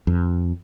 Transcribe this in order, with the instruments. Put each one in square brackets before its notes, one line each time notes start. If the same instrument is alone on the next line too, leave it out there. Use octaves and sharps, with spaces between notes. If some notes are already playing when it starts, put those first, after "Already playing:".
[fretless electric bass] F2